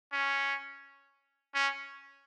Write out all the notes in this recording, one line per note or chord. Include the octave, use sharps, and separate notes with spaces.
C#4
C#4